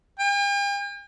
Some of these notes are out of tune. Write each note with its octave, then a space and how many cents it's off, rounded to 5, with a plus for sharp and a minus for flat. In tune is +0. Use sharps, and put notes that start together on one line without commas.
G5 +45